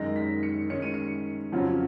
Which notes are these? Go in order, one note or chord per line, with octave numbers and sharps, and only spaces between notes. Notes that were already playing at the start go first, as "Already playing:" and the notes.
Already playing: F#2 D#3 G#3 D#4 A#6
B6
C#7
D#3 G#3 C#4 C#7
D#7
C#7
F2 C#3 F#3 C#4 F4